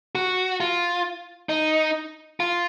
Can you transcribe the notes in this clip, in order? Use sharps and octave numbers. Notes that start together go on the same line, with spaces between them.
F#4
F4
D#4
F4